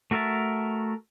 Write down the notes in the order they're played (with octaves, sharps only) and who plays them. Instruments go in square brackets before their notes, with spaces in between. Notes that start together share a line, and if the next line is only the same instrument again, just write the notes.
[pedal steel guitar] A3 F#4 A#4 E5 A5